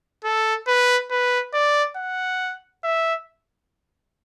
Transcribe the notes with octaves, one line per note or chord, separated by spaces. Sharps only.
A4
B4
B4
D5
F#5
E5